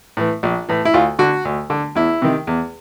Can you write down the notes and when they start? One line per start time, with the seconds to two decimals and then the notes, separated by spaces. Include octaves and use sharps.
0.17 A2 E3
0.43 A#1
0.69 A2 E3
0.85 E4
0.94 D2 F4
1.19 D3 F#4
1.45 D2
1.70 D3
1.95 E2 E4
2.22 C3 D#3
2.47 E2